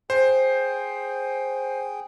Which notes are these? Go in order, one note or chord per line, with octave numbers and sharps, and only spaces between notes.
G#4 C5 G5